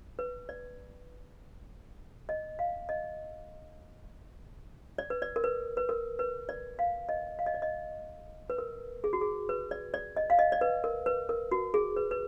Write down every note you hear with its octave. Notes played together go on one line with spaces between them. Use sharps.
B4
D5
D#5
F5
D#5
D5
B4
D5
A#4
B4
B4
A#4
B4
D5
F5
D#5
F5
D#5
D5
D#5
B4
A#4
G#4
F#4
G#4
B4
D5
D5
D#5
F5
D#5
D5
B4
A#4
B4
A#4
F#4
G#4
B4
B4